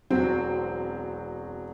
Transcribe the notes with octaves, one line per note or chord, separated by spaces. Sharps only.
E1 F#3 C4 F#4